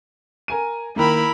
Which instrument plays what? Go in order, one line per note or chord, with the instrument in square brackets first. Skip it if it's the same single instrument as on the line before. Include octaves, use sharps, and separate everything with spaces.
[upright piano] A#4 G#5 D#7
[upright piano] D#3 A#3 [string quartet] E4 A#4 B5